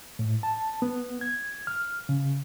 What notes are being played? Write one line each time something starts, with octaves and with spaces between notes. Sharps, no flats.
A2
A5
B3
G#6
F6
C#3